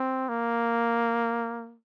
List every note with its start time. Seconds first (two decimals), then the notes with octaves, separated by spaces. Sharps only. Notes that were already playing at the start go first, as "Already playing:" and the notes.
Already playing: C4
0.29 A#3